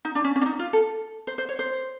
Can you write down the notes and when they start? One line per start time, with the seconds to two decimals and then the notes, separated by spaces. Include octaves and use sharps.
0.05 D#4
0.15 D4
0.24 C#4
0.36 C#4
0.41 D4
0.46 D#4
0.59 F4
0.73 A4
1.27 C5
1.38 C5
1.49 C#5
1.59 C5